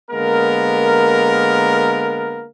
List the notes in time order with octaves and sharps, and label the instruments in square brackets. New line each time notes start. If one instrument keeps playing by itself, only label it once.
[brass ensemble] D3 G#3 A#3 B3 A#4